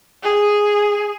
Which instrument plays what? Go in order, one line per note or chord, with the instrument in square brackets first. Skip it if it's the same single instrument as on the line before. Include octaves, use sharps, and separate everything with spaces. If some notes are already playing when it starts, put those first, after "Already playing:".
[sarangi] G#4